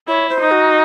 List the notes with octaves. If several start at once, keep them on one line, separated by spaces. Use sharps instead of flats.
E4 C#5
C5
D#4
F#4